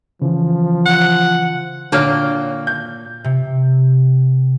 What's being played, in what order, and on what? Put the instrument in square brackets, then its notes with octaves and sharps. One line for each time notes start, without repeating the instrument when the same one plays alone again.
[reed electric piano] C#3 E3 [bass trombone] F3
[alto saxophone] F#5
[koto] A#2 A#3 G5 [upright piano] D3 C#5 F6
[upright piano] G6
[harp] C3